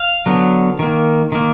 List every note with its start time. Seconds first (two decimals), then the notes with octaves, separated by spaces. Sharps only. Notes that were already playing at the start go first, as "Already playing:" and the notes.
Already playing: F5
0.26 D3 F#3 B3
0.79 D#3 A#3
1.32 D#3 A#3